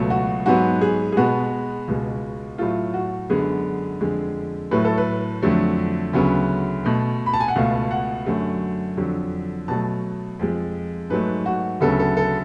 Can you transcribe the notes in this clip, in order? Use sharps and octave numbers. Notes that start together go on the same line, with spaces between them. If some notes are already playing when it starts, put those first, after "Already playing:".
Already playing: C#2 B2 F#3 A3
F#4
G#2 F#3 B3 F#4
G#4
G#4
B2 G#3 B3 F#4
C#2 B2 G#3
A2 F#3 A3 F4
F#4
F#2 D3 G#3 B3 G#4
F2 D3 G#3
A2 F#3 A3 B4
A4
B4
F2 D3 F#3 A3
D2 C#3 F#3 B3
B2 A3
B5
A5
G#5
F#5
C#2 B2 A3 F5
F#5
F#2 D3 F#3 A3
F2 D3 F#3
B2 F#3 A3 A5
F2 F3 G#3
G#2 F#3 A3 B4
F#4
D2 C#3 F#3 B3 A4
A4
A4